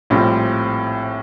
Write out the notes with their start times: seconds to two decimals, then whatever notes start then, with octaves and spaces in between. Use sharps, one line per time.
0.10 A#1 A2 G3 C4 F4